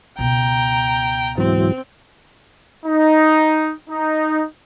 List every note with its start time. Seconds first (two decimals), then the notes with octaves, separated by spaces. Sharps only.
0.19 C#2 B2 G5 A#5
1.38 G#2 E3 F#3 C4
2.86 D#4
3.90 D#4